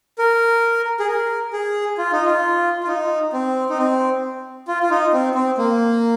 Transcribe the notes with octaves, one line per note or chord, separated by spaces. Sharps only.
A#4
G#4
A#4
G#4
F4
D#4
F4
F4
D#4
C4
D#4
C4
F4
F4
D#4
C4
C4
A#3